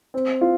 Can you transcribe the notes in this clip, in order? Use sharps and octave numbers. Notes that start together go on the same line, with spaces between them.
C4
F4